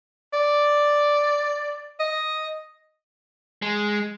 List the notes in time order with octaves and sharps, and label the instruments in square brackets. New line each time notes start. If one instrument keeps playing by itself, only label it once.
[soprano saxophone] D5
D#5
[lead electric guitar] G#3